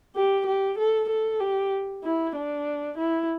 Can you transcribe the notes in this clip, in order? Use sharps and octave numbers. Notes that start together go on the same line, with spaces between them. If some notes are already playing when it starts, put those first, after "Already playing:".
G4
G4
A4
A4
G4
E4
D4
E4